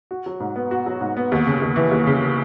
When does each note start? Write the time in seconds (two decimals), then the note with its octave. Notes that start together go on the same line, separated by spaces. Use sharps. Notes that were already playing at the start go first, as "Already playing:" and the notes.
0.11 F#4
0.26 F#3
0.40 G#2
0.56 B3
0.71 F#4
0.86 F#3
1.01 G#2
1.17 B3
1.32 D#2
1.47 C#3
1.61 D#2
1.76 E3
1.91 D#2
2.07 C#3